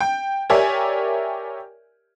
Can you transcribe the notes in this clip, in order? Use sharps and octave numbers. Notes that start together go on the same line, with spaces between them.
G5
G4 A#4 C#5 D5 E5 G#5